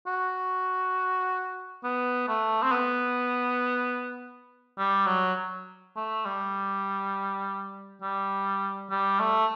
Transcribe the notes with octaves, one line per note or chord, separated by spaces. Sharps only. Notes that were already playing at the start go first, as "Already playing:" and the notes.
F#4
B3
A3
C4
B3
G3
F#3
A3
G3
G3
G3
A3